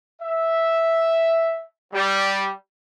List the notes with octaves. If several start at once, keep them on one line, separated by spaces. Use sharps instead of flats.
E5
G3